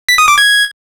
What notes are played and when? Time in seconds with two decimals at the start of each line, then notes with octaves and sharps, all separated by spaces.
0.09 B6
0.18 D#6
0.28 D6
0.38 G#6